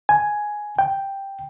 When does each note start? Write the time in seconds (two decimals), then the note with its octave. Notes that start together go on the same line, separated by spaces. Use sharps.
0.09 G#5
0.79 G5